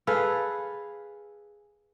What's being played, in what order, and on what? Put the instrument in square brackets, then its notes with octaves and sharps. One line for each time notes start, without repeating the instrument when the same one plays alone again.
[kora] G#4 A4 B4 F5